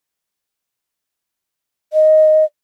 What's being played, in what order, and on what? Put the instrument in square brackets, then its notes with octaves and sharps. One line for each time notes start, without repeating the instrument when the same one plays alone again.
[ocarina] D#5